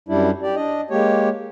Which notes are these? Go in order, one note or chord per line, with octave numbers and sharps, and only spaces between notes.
F#2 G3 D4 E4
G4 D5
D4 D#5
G#3 A#3 G4 C#5